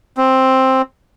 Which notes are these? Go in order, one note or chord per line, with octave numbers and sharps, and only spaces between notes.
C4